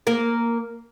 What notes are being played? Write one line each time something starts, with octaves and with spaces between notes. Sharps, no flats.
A#3 A#4